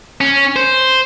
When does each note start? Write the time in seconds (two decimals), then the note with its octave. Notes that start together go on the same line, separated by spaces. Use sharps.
0.21 C#4
0.56 C5